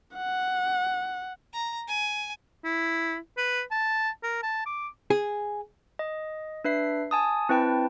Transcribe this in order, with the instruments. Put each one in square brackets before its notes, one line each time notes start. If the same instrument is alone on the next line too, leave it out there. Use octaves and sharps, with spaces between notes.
[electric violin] F#5
[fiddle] A#5
G#5
[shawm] E4
B4
A5
A#4
A5
D6
[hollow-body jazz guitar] G#4
[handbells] D#5
D4 B4 E5 C7
G#5 A5 D#6
C4 E4 B4 G5 A5